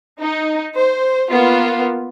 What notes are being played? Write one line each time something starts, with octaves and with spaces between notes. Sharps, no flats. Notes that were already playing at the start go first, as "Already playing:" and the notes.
D#4
C5
A#3 B3 F4